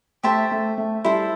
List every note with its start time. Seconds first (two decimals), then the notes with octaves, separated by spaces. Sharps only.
0.23 A3 G4 C5 E5 A5
0.51 A3
0.78 A3
1.05 G3 E4 A4 C5